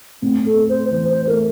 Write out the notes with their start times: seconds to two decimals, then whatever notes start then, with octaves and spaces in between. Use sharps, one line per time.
0.22 A2 C4
0.46 A4
0.57 C4
0.69 C5
0.91 E3 C5
1.09 C5
1.26 A3 A#4